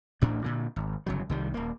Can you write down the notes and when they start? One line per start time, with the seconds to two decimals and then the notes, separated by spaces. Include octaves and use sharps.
0.21 A1 D2 A2 D4
0.44 A#2 D3
0.76 G#1
1.06 G1 C#3 F#3
1.29 C2 D#3 G3
1.54 D#1 A#3